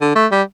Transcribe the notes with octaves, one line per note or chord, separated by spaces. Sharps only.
D3
A3
G3